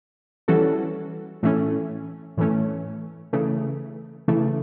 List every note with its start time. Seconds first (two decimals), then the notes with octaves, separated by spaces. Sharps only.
0.48 E3 G3 C#4 F#4 A4
1.43 A2 E3 A3 C#4
2.37 A2 E3 A3 C#4
3.33 C#3 E3 A3
4.28 C#3 E3 A3